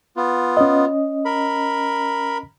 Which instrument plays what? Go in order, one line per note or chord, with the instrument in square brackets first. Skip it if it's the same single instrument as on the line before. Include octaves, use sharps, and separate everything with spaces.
[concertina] B3 F4
[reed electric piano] C#4 D#5
[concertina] A#4 B5